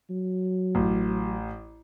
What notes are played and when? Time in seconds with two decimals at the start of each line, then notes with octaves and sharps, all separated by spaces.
0.10 F#3
0.75 A1